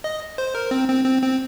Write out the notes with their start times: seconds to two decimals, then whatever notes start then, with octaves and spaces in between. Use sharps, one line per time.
0.04 D#5
0.38 C5
0.55 A#4
0.71 C4
0.88 C4
1.05 C4
1.22 C4